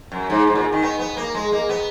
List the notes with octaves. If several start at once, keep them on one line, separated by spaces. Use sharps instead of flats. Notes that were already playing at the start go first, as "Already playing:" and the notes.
F#2
G#2
G#2
A#2
D#3
B3
B3
A#3
G#3
A#3
B3